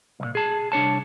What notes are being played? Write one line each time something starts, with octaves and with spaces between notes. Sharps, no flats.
C2 A#2
G#4 A5
C2 D4 C#5 A5